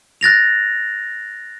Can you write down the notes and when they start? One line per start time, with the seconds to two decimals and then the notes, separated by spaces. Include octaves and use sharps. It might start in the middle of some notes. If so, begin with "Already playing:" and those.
0.21 F#6 A6 A#6 F7